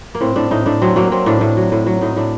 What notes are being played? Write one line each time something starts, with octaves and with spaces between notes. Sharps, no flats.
A#3
A2 C4
A2 D4
A2 D#4
A2 D4
F#3 C4
F#3 A#3
F#3 C4
A2 D4
A2
F#3
A2
F#3
A2 D#4
A2 D4